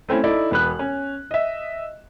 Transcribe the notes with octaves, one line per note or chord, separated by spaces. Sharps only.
A3 C4 C#4 E4
D#4 E4 A4 D5
E1 B3 F#6
C#4
D#5 E5